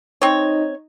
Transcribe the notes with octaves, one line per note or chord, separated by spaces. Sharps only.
C4 D#4 C#5